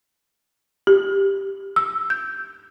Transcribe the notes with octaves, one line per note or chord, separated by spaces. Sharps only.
G4
E6
G6